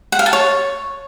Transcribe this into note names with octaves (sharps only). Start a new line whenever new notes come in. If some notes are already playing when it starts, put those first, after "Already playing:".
F#5
F5
A5
C#5